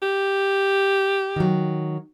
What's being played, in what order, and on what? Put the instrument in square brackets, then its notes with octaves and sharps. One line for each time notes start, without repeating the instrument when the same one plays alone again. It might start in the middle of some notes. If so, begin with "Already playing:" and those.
[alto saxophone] G4
[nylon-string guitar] D#3 F#3